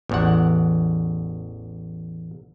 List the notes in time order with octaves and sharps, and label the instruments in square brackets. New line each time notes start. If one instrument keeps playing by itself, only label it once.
[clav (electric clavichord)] A1 E2 F#5